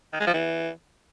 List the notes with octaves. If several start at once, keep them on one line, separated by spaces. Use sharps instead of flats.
D#3
G#3
F3
E3